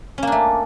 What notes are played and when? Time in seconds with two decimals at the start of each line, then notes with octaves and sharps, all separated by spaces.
0.18 C#4
0.23 A#3
0.27 D4
0.32 A3